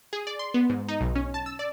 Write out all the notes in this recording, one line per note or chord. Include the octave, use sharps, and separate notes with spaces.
G#4
D5
C6
B3
G#2
D#4
B1
C#4
A5
E6
D5